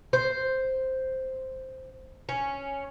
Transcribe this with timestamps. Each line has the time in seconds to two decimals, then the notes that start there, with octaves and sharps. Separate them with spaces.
0.13 C5
2.29 C#4